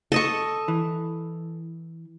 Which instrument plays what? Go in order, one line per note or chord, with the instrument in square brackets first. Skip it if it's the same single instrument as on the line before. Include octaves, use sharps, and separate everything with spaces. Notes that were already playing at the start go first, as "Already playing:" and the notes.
[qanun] A4 D#5 C#6
[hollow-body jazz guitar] E3